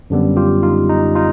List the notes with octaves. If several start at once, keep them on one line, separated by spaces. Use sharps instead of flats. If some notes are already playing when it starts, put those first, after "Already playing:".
F#2 D3 G3 B3
F4 G4
D#4 F4
D#4
D#4 F4